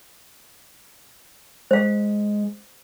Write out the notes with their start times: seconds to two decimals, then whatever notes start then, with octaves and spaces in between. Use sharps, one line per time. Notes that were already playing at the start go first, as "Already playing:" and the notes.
1.71 G#3 C5 F5